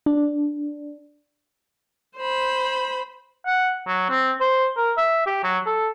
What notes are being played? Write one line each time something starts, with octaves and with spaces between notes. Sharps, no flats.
D4
C5 B5
F#5
F#3
C4
C5
A#4
E5
G4
F#3
A4